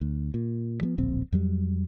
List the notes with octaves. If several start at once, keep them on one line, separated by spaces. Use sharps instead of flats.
D2
A#2
F3 G3 B3
D1 A#1 C4
F2 F#3 G3